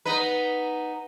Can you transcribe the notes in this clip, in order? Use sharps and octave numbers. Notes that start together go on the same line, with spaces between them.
B3 D#4 B4